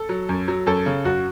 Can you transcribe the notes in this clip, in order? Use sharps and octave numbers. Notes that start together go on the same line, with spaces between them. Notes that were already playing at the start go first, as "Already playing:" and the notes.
Already playing: A4
F#3
F#2
F#3
F#2 A4
C#3
F#2 F#4